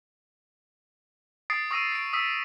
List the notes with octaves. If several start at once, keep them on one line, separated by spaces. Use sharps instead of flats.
D#6 A6 C7 D7
C#6 D#6 E6 A#6 D7 D#7
C7 D7
D#6 E6 B6